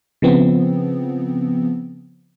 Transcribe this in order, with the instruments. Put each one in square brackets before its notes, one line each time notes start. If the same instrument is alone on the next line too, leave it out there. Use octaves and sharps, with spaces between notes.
[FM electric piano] C#3 F3 B3 C4